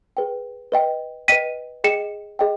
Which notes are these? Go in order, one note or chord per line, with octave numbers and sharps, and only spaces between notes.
G#4 B4 G5
B4 D#5 G5
B4 D#5 G5 B6 D#7
G#4 D#5 G5 C#7 E7
G#4 D#5 G5